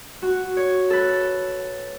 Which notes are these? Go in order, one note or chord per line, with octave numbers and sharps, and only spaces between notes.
F#4
C#5
A4 B4